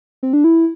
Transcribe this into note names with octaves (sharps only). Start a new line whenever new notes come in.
C4
D4
E4